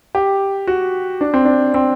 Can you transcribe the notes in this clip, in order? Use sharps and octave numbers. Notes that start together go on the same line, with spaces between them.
G4
F#4
D4
C4
D4
C4